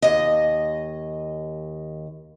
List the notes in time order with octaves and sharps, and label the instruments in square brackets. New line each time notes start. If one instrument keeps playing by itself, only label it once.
[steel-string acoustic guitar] D#2 D#5